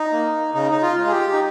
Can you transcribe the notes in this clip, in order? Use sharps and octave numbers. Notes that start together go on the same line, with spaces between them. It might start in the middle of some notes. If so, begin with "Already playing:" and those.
Already playing: D#4
A#3
C#3 D#4
D#4
F4
G#3
G#4
G4
D#4